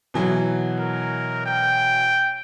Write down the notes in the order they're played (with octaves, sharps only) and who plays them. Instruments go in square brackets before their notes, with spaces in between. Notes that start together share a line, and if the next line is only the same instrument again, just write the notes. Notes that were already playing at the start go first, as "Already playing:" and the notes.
[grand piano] B2 E3 F#3
[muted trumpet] A#4
G5